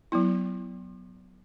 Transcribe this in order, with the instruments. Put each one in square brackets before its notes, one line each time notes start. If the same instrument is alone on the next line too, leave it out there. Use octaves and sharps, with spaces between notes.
[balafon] F#3 B3 E4